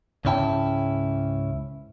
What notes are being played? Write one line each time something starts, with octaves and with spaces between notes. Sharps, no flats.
C#2 G#2 C#4 E4 G5 A5